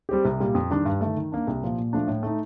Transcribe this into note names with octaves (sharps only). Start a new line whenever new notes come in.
G3 C4 G4
C2
A#2 G3 A#3
F2
D#3 G3 D4 G4
G2
D#3 A3
D#3
A#3 D4
C2
A#2 F3
A#2
F3 A3 D4
A2
A3 D#4